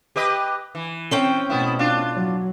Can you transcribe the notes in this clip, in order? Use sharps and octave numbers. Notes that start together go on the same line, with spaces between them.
G4 B4 D#5
E3
C4 C#4 G5
B2 A3 B3 E4
D4 F4
F#3